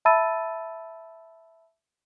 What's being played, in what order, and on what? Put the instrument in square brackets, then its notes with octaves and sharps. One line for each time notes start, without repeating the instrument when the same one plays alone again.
[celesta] E5 A5 B5 E6 A6 D#7